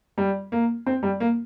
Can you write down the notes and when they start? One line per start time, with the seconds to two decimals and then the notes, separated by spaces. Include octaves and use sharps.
0.18 G3
0.52 A#3
0.87 C4
1.03 G3
1.20 A#3